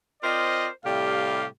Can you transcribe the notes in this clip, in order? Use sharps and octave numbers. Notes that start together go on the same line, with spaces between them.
C4 F4 A#4 C5 D5 D#5
A2 C3 G3 G4 F5